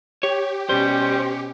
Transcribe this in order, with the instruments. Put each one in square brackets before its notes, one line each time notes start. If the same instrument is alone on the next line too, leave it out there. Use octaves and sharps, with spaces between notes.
[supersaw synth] G4 [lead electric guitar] C#5
[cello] B2 C#4 [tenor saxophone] G3 [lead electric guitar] C5